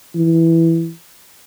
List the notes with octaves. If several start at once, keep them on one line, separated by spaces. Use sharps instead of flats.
E3